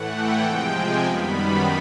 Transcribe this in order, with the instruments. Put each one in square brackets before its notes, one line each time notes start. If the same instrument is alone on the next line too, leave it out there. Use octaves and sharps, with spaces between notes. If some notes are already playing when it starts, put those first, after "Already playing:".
Already playing: [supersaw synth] A2 E3 A3 F#5
G5
C3 F3 G#3
G#5
F#2 D#3 G3 B3 B5